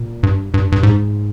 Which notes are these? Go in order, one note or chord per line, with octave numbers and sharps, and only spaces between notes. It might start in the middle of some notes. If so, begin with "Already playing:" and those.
Already playing: A#2
G2
G2
G2
G#2